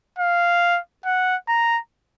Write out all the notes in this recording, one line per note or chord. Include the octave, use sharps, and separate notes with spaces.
F5
F#5
A#5